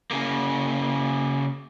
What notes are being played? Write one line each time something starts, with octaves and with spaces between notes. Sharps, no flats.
C#3 A#3